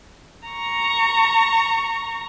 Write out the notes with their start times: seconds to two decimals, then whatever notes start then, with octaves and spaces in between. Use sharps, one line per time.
0.48 A#5 C#6